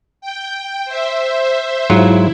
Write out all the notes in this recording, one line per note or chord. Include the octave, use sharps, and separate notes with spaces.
G5
C5 E5
G#2 F#3 E4 F4